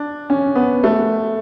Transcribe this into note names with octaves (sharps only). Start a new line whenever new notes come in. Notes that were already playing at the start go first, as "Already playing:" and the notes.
Already playing: D4
C#4
B3
A3